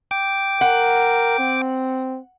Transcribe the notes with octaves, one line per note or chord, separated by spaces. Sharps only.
G5 D6
A#4 F#5
C4